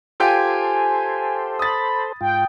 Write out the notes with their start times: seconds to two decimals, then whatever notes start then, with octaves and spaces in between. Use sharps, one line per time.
0.20 F4 G4 A4 C5 G5 G#5
1.59 B5 D#6 A6
2.21 G#2 F4 G5